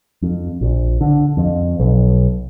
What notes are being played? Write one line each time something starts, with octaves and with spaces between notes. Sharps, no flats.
F2
A#1
D3
F2
B1